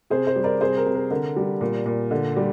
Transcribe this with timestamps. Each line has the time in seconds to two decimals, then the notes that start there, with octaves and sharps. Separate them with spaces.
0.10 C3 G#4 C5
0.27 G#4 C5
0.36 G3
0.44 A#4 D5
0.61 C3 G#4 C5
0.77 A#4
0.86 C3
0.95 A#4
1.11 D3 A#4
1.37 G3
1.61 A#2
1.86 A#2
2.11 D3
2.37 G3